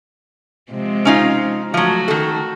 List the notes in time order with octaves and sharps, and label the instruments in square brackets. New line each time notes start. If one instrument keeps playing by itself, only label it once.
[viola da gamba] C3 F3 G#3
[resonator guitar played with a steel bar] C#4 D#4 F4
[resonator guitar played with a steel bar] F3 F#3 [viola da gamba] A3 F#4
[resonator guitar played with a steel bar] D#3 A4